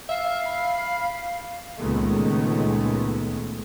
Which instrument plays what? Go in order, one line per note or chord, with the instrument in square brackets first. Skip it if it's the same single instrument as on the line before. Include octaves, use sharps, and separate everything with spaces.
[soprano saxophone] E5 [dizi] F5
[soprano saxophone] B5
[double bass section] C#2 A#2 D#3 G#3 A3 B3